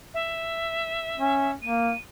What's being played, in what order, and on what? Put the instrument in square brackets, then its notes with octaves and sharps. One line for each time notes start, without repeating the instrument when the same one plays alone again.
[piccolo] E5
[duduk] C#4
[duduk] A#3 [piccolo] D#7